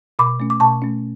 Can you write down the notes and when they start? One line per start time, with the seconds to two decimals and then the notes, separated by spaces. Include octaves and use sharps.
0.19 B2 B5 D6
0.40 A3 C#4
0.50 D6
0.60 B2 A5 C#6
0.82 A3 C#4